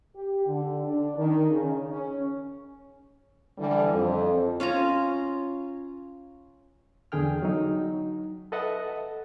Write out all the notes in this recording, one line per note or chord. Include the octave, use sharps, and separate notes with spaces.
G4
D3
D4
D#3
C#3
C#4
D3 E3 G3
F2
C#4 F4 D#5 A#5
E2 D3 G#4 G5 F6
F#3 D#4
A4 B4 D#5 E5 F#5 A5